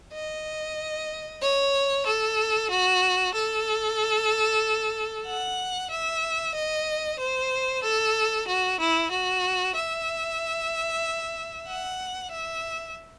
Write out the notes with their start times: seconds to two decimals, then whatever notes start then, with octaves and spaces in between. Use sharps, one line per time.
0.13 D#5
1.42 C#5
2.06 A4
2.70 F#4
3.34 A4
5.26 F#5
5.90 E5
6.54 D#5
7.19 C5
7.83 A4
8.48 F#4
8.80 E4
9.11 F#4
9.76 E5
11.67 F#5
12.31 E5